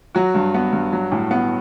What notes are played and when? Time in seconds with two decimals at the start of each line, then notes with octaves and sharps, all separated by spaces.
0.15 F#3 F#4
0.35 G2
0.54 B3
0.73 G2
0.93 F#3
1.12 A2
1.31 B3